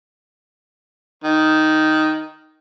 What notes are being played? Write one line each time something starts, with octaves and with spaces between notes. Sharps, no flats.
D#3